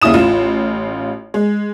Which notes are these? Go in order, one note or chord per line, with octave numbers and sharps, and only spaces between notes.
D#2 C#3 E4 D#6 E7
A1 F4
G#3